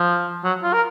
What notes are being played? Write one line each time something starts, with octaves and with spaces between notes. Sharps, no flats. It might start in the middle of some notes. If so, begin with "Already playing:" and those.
Already playing: F3
F#3
F4
A#4